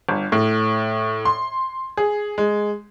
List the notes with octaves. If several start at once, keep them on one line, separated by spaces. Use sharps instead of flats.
G1
A2
C6
G#4
G#3